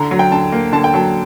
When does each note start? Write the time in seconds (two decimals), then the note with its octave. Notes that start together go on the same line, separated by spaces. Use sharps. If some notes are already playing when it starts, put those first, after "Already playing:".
Already playing: D3 A#5
0.11 F#3
0.19 G5
0.32 D3 A5
0.52 A#3
0.73 D3 A5
0.84 G5
0.94 F#3 A5